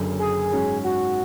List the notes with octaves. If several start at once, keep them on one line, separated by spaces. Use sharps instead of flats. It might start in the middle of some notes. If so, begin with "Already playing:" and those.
Already playing: F#1 F#2 D3
G#4
G#2 F#3 C#4
F#4